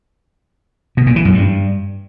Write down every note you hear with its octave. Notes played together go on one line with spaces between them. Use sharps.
B2
A#2
E3
F#2
G2